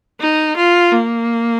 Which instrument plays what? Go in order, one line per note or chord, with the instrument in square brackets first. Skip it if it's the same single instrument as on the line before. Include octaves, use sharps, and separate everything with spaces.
[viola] D#4
F4
A#3